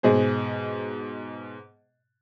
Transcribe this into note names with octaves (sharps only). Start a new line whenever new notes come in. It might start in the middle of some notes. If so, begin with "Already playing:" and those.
G#2 B2 G#4 C5